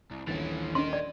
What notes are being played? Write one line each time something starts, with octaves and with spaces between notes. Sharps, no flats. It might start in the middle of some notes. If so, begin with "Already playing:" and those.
C2
D#1 A#1 E3 C#4 A6
C#4 D4 A#4 D#5 C6
D5